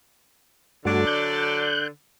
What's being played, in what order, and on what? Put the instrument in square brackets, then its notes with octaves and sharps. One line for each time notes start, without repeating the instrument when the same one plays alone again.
[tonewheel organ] G2 A3 F#4 [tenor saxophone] D3 [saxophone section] F#3 D4 D5
[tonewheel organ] F#6 G6